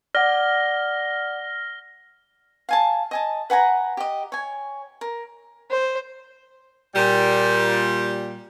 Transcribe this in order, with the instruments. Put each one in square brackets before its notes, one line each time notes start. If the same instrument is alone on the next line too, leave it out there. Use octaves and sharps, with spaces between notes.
[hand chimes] D5 F#5 [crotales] F6 A#6 G7
[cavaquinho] F5 G#5 A5
D#5 G#5 A5
B4 F#5 G#5 A#5
G4 D#5
C#5 G#5
A#4
[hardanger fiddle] C5
[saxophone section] A#2 G3